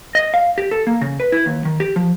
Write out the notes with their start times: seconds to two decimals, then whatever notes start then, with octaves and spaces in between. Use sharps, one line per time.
0.15 D#5
0.34 F5
0.58 G4
0.71 A4
0.87 A#3
1.01 C#3
1.20 B4
1.32 E4
1.46 D#2
1.65 D#3
1.80 G4
1.96 F3